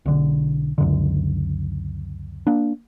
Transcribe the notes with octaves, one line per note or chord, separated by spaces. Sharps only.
B1 D3
C#2 F#2 D3
A#3 D4